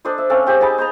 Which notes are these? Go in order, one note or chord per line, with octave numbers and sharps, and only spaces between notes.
D4 A4 C5 D#5
E5
C4 C#4 A4 F5
C4 G4 G#4
D#4 G#4 A5 B5
C5 D#5 A#5